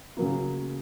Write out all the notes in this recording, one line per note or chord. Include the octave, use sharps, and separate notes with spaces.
C#3 F#3 A#3